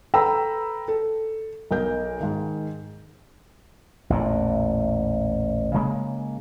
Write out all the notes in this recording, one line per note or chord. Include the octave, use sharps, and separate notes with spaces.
A4 B4 G5 A#5 B5 E6
A4
B1 A#4 G6
G#2 D#3
A1 E2 A#2
C#3 G#3 A#3